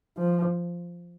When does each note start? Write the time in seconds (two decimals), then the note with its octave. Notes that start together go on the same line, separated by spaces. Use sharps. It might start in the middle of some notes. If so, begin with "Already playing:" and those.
0.18 F3